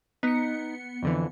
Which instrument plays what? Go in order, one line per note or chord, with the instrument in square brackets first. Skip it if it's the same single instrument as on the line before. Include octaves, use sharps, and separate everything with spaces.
[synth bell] B3 C#7 [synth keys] D#4
[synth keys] F2 D3 E3